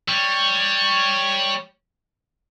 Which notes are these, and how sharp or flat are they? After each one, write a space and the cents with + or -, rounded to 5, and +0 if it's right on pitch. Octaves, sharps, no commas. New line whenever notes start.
G3 +5 C#5 +0